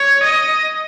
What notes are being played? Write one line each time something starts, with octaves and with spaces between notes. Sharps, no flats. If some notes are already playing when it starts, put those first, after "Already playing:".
Already playing: C#5
D#5